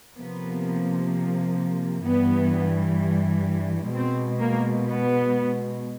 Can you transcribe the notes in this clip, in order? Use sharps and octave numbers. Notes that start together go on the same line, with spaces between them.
C3 F3 A#3 B3
G2 E3 G3 B3
B2 G#3 C4
A#3
B3